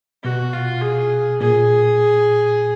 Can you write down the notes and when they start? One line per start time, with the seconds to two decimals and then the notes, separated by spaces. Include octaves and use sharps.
0.24 B2 F#4
0.53 F4
0.82 G#4
1.40 A#2 G#4